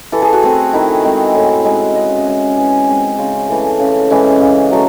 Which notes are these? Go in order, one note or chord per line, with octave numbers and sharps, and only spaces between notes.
E3 A4
G#4
F#4
A3 C4 G#4
D#3 E4
G#3 C4
A2
G#3 C#4
C#3 D#5
E5
G#3 C#4
E3 G#4
G#3 C4
C#3 C5
E3 A3
C#3
E3 G#3 C#4
C#3
F#3 A3